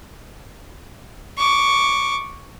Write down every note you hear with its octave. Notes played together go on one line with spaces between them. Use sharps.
C#6 D6